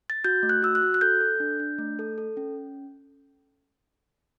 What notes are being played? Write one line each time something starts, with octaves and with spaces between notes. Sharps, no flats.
A6
F#4 G6
A3
F#6
F#4 E6
F#6
F#4
F#6
A4 G6
A4
D4
D4
A3
A4
A4
C#4